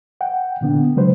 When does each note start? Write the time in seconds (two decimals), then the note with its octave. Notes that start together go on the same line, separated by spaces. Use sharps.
0.21 F#5 G5
0.61 A#2 D3 B3 D4
0.96 C#3 F#3 G#3 B4 C5